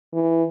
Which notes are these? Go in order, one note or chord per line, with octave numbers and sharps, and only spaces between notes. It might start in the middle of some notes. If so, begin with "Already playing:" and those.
E3